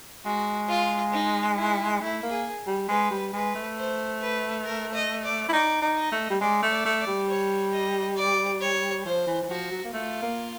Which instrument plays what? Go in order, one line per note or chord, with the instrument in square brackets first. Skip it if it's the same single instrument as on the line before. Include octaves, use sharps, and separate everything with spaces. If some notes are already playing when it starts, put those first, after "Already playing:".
[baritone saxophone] G#3 [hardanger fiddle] F#4
[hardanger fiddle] F4
D#4
E4
[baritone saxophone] A3 [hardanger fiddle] E4
[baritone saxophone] A#3
[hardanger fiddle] G#4
[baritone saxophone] G3
[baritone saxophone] G#3 [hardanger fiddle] B4
[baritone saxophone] G3
[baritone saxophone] G#3 [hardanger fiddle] B4
[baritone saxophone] A3
[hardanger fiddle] C5
B4
A#4
D#5
D5
[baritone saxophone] E4
[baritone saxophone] D#4 [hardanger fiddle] D5
[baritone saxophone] D#4
[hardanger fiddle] D#5
[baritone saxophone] A3
G3
[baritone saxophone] G#3 [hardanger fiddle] D5
[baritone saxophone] A3
[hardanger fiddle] D5
[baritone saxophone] A3
[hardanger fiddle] D5
[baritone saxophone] G3
[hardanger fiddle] C#5
D#5
D5
C#5
[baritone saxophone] F3 [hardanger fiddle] C5
[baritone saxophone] E3
E3
[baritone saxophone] F3 [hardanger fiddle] F#4
[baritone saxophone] F#3
A#3
[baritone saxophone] A3 [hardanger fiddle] F4
[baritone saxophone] A#3